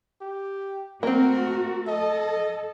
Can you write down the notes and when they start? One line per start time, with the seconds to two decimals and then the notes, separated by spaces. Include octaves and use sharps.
0.21 G4
1.03 A3 A#3 C4 F#4 A#4
1.87 A4 D#5